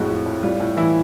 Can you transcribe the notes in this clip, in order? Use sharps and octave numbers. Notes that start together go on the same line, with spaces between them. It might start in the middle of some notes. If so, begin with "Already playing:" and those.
Already playing: F2 A2 G#3 F#4
F3
A2
G3 F4
A2
E3 E4